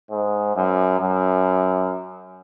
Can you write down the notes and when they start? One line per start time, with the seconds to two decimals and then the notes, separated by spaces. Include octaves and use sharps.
0.11 G#2
0.56 F#2
1.00 F#2